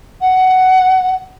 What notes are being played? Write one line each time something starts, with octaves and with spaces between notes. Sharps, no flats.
F#5